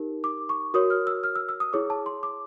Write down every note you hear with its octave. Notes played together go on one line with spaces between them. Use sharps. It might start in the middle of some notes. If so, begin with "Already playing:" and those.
Already playing: D#4 G4 A#4
D6
C#6
F#4 A#4 C#5 D#6
F6
E6
F6
E6
E6
D#6
E4 G#4 C#5 D6
A5
C6
D6